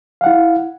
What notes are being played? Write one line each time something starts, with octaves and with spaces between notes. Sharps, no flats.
E4 F5 F#5